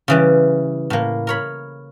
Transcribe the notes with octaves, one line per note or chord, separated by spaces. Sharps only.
C#3 E3 G3
A2 A#3
A#4 C#5 B5